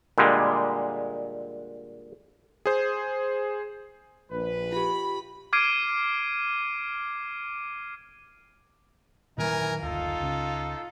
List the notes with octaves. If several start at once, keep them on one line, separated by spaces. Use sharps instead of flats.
A#2 D3 G3 G#3
G#4 C5
A#1 B4
F4 G4 B5
D6 F6 G#6 C7 D7 D#7
A#2 D#3 E3 F#3 A#4 G#5
F#1 D2 D#4 F4 A4
C#2 C#3